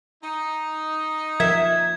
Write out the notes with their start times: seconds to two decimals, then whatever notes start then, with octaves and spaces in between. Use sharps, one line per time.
0.24 D#4
1.40 F3 A#4 E5 G#6